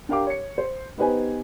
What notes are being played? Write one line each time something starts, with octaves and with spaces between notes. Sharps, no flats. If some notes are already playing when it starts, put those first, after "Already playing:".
D4 G4 A#4 F5 G5 D6
C#5 C#7
C5
B3 D#4 G4 B4 C5 G#5